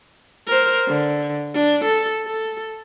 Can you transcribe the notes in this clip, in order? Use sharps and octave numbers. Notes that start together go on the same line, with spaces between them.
A#4 C5
D3
D4
A4
A4